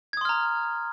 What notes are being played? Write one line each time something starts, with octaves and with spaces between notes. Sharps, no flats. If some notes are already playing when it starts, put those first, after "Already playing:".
A#5 C6 D#6 F6 G#6